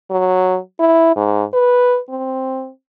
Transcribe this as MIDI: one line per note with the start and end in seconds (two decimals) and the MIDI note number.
0.10 0.58 54
0.80 1.15 64
1.16 1.44 44
1.53 1.99 71
2.10 2.70 60